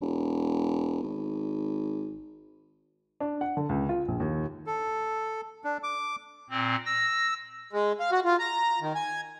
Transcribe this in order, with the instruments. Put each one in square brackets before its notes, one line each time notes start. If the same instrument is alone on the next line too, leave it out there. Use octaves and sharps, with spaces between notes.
[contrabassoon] E1
G#1
[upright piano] D4
F#5
D3
C#2
F4
A#1
D#2
[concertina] A4
D4
D6
[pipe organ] A#2 C4
E6 A#6
[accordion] G#3
F5
F#4
F4
A#5
D#3
G#5